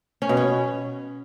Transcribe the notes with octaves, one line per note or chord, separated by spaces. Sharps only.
C#4
B2
C#4